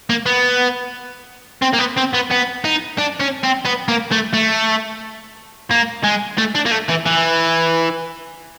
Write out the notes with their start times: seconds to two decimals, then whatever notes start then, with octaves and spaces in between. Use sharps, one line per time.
0.10 A#3
0.26 B3
1.62 C4
1.73 A#3
1.78 B3
1.97 C4
2.13 B3
2.30 B3
2.64 D#4
2.98 D4
3.21 C#4
3.44 C4
3.65 B3
3.88 A#3
4.12 A3
4.34 A3
5.71 A#3
6.04 G#3
6.38 A3
6.55 D4
6.66 A#3
6.72 A3
6.89 E3
7.06 E3